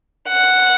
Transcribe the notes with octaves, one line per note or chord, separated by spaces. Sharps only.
F#5